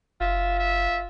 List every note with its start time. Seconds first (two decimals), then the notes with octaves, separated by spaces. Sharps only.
0.21 F#1 F4 E5
0.59 E5